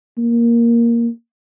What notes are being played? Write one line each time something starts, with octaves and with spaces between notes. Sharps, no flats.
A#3